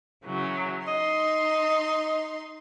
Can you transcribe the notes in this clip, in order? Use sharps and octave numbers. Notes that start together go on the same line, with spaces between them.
C#3 E3 F#3
D#4 D#5 C6